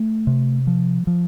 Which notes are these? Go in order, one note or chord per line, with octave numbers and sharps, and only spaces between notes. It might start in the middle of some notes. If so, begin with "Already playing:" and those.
Already playing: A3
C3
F3
F3